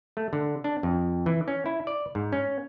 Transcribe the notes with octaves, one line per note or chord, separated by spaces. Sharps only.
A3
D3
D4
F2
E3
C#4
E4
D5
G#2
C#4